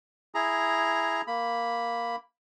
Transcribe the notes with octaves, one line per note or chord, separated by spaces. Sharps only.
E4 G#4 A#5
A#3 B5